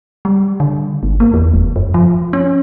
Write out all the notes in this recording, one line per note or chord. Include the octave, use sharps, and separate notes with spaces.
G3
D3
G#1
A#3
E2
F1
F#2
F3
C#4